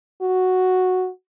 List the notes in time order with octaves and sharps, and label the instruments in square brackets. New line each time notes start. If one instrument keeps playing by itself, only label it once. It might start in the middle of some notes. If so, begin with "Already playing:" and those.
[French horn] F#4